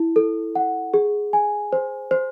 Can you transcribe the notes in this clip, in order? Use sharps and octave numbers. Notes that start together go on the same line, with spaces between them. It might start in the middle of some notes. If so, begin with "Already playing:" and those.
Already playing: E4
A4
F#5
G#4
G#5
C5
C5